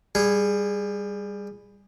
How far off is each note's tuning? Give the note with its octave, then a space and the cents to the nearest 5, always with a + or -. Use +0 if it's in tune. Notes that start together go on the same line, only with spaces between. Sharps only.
G3 +15 G#4 -10